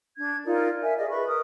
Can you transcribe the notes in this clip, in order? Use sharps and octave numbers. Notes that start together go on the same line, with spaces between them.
D4 G#6
D#4 F4 A#4 D5
A#4 E5 G#5
G#4 D5 D#5
B4 B5 C#6
A#4 D#6